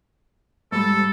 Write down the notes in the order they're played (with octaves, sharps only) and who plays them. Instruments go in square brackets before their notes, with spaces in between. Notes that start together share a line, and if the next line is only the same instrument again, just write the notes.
[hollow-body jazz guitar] G#2 G3 [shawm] A4